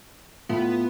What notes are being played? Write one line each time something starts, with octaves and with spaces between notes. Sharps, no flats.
A2 A3 B3 F4